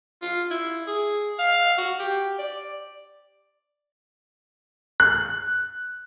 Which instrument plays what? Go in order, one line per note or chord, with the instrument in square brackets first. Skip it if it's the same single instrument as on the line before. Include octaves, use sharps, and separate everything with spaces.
[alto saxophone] F4
E4
G#4
F5
F#4
G4
D5
[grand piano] F#6